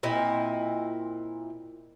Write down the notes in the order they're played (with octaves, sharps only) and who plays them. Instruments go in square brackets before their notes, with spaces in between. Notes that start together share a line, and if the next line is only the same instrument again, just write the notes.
[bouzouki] A#2 C4 E4 D#5